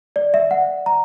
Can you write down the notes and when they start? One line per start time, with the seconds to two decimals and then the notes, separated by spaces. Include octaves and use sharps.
0.16 D5
0.34 E5
0.51 F#5
0.86 A#5